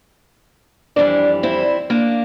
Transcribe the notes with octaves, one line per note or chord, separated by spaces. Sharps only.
F2 E3 G3 A#3 D4
C4 E4
A#3 D4